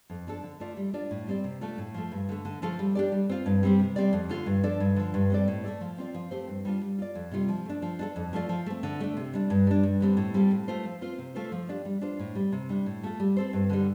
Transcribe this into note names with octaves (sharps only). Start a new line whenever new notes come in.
F2
F3 D4 A4
D3
A3 F4 D5
G3
D4 F4 D5
A2
G3 C4 G4 D5
C3
A3 D4 F4 A4
A2
F3 A3
G2
D3 A3
D3
F3 A3 F4 A4
G3
D4 G4 D5
G3
C4 F4
G2
G3 C4 G4
C3
G3 C4 G4 D5
F2
D3 A3 F4
G2
F3 D4 A4 D5
G2
D3 F3
G2
G3 C4 A4 D5
A2
A3 C4 A4 D5
F3
C4 F4 D5
F3
A3 C4 G4 C5
G2
G3 D4 F4
G3
F4 D5
F2
C3 G3 F4
F3
A3 D4
F3
D4 F4 A4
F2
F3 A3 F4 D5
F3
A3 C4
D3
A3 D4
C3
G3 D4
G2
G3 D4
G2
D3 G3 C4
A2
G3 C4 F4 A4
A2
A3 F4 C5
F3
C4 F4 C5
C3
A3 F4 A4 C5
F3
D4 G4 D5
G3
D4 F4 C5
A2
G3 C4
C3
G3 D4
A2
A3 F4 A4
G3
C4 A4 C5
G2
D3 G3